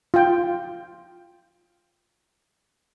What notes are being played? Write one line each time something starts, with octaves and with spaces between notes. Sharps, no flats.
F4 G5